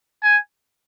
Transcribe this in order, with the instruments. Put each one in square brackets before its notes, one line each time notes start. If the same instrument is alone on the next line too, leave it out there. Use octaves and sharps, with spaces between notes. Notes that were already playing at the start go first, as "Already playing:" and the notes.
[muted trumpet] G#5